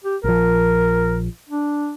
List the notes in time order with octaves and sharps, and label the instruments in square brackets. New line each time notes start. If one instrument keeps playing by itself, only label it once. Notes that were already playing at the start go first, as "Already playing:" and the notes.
[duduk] G4
[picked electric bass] A#1 F3 [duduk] A#4
[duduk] D4